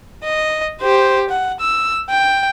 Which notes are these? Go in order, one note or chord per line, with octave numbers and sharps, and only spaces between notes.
D#5
G4 C5
F#5
E6
G5